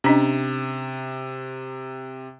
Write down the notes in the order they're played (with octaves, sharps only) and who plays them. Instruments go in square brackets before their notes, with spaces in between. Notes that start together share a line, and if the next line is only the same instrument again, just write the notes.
[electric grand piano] C3 [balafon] C#4 D4 D#5